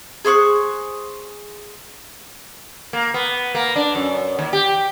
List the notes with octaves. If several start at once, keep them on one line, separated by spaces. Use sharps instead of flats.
G#4 C5 C#6 F#6
A#3
B3
A#3
D4
F#2
D#2
G4